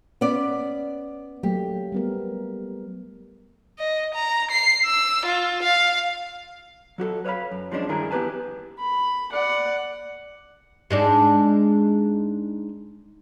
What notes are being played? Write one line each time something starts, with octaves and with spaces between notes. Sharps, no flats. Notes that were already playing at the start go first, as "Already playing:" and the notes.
B3 C#4 D5
F#3 A3 A#3 G4
G3 B3 A#4
D#5
A#5
C7
E6
F4
F5
F#3 F#4 G4 A4
B4 C#5 D#5 F5 B5
F#2
F3 G#3 C#4 D4
G2 D#3 D4 E4 G#4 A#4
B3 E4 G4 B4 G#5 A5
B5
D5 F#5
G#2 G#3 D4